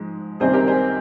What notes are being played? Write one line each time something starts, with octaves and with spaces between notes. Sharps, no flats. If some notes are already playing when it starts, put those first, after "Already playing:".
Already playing: G#2 F3 G#3
C#2 C3 D#3 G3 C4 G#4 C5
G4 A#4
G#4 C5